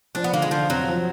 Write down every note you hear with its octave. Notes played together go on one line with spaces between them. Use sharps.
F3 D4
B3
D3 A#3
G#3
D3 F3
F2 F#3
F3